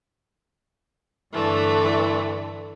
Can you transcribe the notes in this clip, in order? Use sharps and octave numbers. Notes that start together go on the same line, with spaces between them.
G2 D3 E3 A3